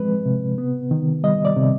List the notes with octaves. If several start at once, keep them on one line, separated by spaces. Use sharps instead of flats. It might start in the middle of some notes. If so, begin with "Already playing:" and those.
Already playing: F3 G#3 C4 B4
C3
B3
D#3
G3 D#5
D5
C3